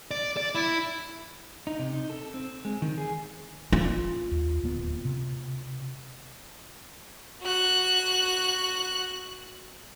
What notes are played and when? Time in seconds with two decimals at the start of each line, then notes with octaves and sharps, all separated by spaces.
0.11 D5
0.37 D5
0.55 E4
1.67 D#4
1.79 C3
1.93 D#4
2.10 A4
2.34 C4
2.65 G#3
2.82 D#3
2.98 G#4
3.72 F4
4.31 D#2
4.64 D1 A#3 B3
5.05 C3
7.43 F#4 F#6